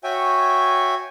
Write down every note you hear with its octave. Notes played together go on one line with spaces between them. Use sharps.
F#4 C#5 E5 G5 G#5